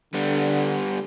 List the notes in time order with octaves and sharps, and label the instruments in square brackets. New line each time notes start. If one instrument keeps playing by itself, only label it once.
[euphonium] D3 [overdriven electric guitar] G3 B3